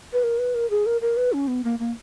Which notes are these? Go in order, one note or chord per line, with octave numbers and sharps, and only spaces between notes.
B4
A#4
B4
A#4
G#4
A#4
A#4
B4
C#4
B3
A#3
A#3